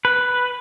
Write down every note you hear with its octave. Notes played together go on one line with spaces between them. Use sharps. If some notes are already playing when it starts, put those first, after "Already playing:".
B4